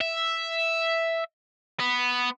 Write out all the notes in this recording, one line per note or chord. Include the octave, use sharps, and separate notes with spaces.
E5
B3